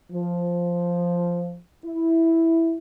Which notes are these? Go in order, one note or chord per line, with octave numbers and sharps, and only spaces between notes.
F3
E4